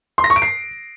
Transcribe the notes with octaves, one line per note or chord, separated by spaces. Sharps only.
C6
A#6
C#6
D7
C7